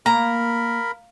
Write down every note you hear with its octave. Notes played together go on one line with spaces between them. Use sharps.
A#3 A#4 A#5 B5